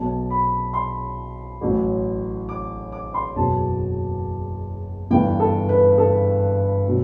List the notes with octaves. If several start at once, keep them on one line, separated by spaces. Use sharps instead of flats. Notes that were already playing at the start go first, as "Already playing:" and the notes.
Already playing: B1 B2 F#3 A5
B5
C6
A1 A2 F#3
D6
D6
C6
F#1 E2 B2 F#3 A5
G1 G2 E3 G3 G5
A4
B4
A4
B2 F#3